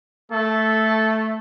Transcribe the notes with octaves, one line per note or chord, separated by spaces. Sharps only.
A3 A4